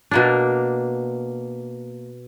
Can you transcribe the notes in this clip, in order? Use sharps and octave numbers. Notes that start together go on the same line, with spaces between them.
B2 A#3 D4